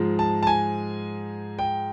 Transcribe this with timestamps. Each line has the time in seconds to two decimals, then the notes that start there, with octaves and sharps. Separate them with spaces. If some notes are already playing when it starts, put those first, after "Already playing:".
Already playing: G#2 F3 G#3
0.19 A5
0.43 A5
0.47 G#5
1.59 G5